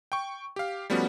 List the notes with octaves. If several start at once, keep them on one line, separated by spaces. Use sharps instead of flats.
G5 C#6
G4 F5
F3 G3 A3 B3 C#4 F#4